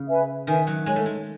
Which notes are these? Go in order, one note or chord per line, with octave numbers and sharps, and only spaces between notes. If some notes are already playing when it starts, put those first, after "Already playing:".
Already playing: C#3
B4 E5 G#5
D#3 B4 E5 G#5
F#3
G#3 A4 C#5 G#5
A3
G#3